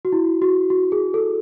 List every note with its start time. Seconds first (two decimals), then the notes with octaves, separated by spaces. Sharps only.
0.05 F#4
0.13 E4
0.42 F#4
0.70 F#4
0.92 G#4
1.14 A4